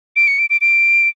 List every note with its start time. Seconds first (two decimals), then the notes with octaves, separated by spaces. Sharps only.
0.16 D7
0.27 C#7
0.39 D7
0.50 D7
0.61 D7